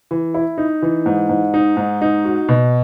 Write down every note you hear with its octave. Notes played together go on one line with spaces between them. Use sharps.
E3
E4
D#4
E3
G#2
G#2
D#4
G#2
D#4
F#4
B2